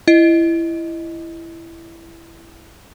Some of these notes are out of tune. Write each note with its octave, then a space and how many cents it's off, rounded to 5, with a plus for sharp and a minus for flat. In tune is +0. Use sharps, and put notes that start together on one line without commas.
E4 +15 D#5 +0